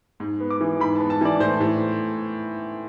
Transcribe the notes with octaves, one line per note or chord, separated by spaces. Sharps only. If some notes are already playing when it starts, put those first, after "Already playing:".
G#2
B3
D6
E3
G#2 B5
B3 A5
A5
E3 D5
A2 C5
A2